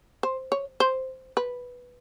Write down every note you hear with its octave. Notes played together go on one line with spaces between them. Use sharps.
C5
C#5
C5
B4